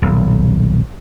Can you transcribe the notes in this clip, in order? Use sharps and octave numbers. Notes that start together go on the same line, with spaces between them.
D#1 B1